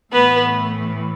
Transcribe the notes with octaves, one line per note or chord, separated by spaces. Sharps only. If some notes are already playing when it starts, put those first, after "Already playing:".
A2 E3 A3 B3 B4